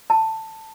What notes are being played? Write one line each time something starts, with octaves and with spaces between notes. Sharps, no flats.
A5